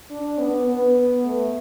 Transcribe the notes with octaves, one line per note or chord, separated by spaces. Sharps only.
D4
B3
B3
A3